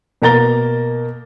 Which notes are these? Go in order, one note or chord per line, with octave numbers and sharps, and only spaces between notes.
B2 A#3 A#5 A6 G7